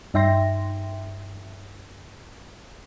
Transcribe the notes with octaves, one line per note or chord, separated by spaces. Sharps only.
G2 D#4 E5 G5 C6 A#6